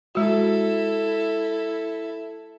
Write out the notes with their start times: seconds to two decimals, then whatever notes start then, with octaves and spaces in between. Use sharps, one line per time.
0.15 G#3 E4 F#4 A4